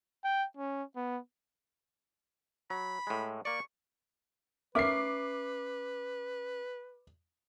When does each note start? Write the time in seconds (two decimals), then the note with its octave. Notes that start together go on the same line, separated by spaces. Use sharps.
0.24 G5
0.57 C#4
0.96 B3
2.70 F#3 B5
3.07 A2 G#3
3.45 A#3 D5 C#6
4.75 C#4 A#4 B4 E5 D6 C7